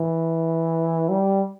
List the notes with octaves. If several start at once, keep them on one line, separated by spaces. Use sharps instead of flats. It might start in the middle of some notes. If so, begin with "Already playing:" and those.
Already playing: E3
G3